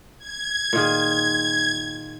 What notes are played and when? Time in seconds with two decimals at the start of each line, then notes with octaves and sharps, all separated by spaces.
0.18 G#6
0.73 A#2 D#3 G#4